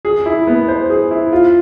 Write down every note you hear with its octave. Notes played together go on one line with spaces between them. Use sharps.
G#4
E4
B3
C5
G#4
E4
F4